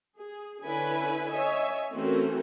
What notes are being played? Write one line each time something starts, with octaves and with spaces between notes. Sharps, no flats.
G#4
D3 C#4 E4 B4 G#5 B5
C#5 D#5 E5 G#5
E3 A3 C4 C#4 F#4 A#4